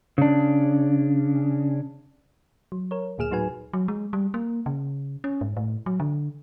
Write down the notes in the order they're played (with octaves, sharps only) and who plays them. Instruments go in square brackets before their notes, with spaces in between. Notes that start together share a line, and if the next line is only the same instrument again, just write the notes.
[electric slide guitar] C#3 D4
[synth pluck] F#3
A#4 C#5
D2 A#2 G#4 F6 E7
A2 F#3 D#4 F#4 B4 G#5
[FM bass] F#3
G#3
G3
A#3
C#3
C#4
G#2
A2
F#3
D3